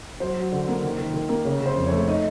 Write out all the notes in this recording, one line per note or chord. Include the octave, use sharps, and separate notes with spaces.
F#3 C5
F#3
D3
A#3
D#3
D#3
D#3
A#3
C#3 C#5
C#3 C5
F2
A3 C#5
D#4 D#5